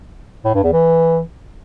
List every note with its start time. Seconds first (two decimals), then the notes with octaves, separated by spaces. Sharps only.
0.45 A2
0.54 G2
0.64 E2
0.73 E3